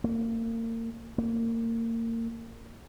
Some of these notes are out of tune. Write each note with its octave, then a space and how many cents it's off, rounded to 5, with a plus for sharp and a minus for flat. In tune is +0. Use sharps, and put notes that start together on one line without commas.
A#3 -35
A#3 -30